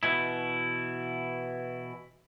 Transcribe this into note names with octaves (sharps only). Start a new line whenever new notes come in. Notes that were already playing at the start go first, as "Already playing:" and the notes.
B2 E3 E4